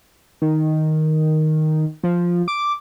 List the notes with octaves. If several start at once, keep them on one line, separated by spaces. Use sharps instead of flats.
D#3
F3
D6